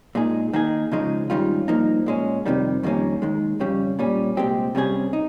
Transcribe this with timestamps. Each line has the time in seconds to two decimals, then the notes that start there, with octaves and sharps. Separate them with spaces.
0.15 A#2 G#3 D#4 G#4
0.53 D#3 A#3 D#4 G#4
0.91 C#2 C#3 F3 G#3 D#4
1.30 G#2 D#3 G3 C#4 F4
1.68 G2 F3 A#3 D#4
2.06 A#2 G#3 C#4
2.46 F2 C3 D#3 G3
2.83 F2 D#3 G3 A#3 C#4
3.22 D#2 D#3 G#3
3.60 F2 C#3 G3 C#4
3.99 A#2 G3 C#4
4.37 C2 A#2 G#3 C4 G4
4.75 C3 G3 C#4 G#4
5.13 D#4